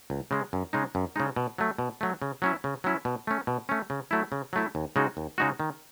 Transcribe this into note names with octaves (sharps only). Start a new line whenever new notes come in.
C#2
C#3 G#3
F#2
C#3 G#3 D#4
F#2
C#3 G#3 D#4
B2
F#3 A3
B2
F#3 A3
C#3
F#3 C#4 E4
C#3
F#3 C#4 E4
B2
A3 C#4
B2
A3 C#4
C#3
F#3 A3 E4
C#3
F#3 A3 E4
D#2
C#3 G#3 D#4 F#4
D#2
C#3 G#3 D#4 F#4
D#3